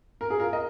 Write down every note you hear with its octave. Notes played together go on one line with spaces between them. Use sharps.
A#4
G#4
F4 A#4
A#4 D#5